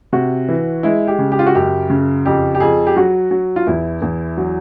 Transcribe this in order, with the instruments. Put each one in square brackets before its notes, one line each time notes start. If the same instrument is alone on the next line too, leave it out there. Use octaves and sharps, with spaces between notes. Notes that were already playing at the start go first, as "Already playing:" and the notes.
[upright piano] C3 F#4
E3
G#3 E4
G4
C#3
G4
F4
F#4
F#2 G4
C#3
F2 G4
G4
F2 G#4
G4
F#3 F#4
F#3
F4
E2 E4
E2
F#3